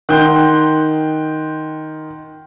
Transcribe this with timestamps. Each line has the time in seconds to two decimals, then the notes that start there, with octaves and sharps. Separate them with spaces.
0.09 D#3 F#5 G5 C6